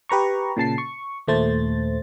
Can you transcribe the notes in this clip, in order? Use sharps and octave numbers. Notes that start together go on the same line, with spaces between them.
G4 B4 A#5 C#6
A#2 C#3 A5 C7
C#6
D#2 A#2 A3 C5 A6